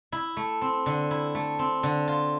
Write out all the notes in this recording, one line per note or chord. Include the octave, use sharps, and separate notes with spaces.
E4
A3
C4
D3
E4
A3
C4
D3
F4